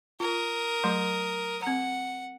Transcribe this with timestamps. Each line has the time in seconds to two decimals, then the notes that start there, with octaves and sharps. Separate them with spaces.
0.20 F4 A#4 D#6
0.84 F#3 A3 C6
1.62 C4 F#5 A#5